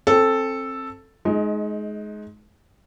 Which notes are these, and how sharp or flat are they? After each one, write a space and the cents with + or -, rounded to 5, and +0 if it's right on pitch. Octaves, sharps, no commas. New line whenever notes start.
C4 +25 A4 +0
G#3 +25 D#4 +0